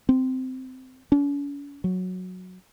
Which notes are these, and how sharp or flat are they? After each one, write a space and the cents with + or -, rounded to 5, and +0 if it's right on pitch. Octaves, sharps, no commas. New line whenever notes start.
C4 -15
C#4 +45
F#3 -10